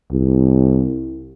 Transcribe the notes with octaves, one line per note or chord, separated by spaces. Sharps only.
C2